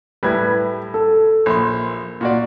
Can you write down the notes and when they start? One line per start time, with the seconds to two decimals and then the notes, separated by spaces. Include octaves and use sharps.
0.23 A2 G3 B4 G#6
0.94 A4
1.46 A#1 C6
2.21 A#2 F#4 D5